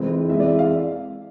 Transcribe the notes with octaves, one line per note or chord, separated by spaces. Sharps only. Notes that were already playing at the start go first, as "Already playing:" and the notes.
Already playing: F1 F2 E3 G#3 C4
F2 E3 G#3 E5
D5
E5
F5